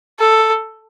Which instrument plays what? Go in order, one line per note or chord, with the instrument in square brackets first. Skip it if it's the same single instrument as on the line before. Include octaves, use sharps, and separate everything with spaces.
[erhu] A4